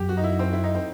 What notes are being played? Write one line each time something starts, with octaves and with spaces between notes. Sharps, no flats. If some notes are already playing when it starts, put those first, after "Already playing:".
Already playing: F#2 G4
F#4
D#4
E4
C4
E4
D#4
C4